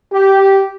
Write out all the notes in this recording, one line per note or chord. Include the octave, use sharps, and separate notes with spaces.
G4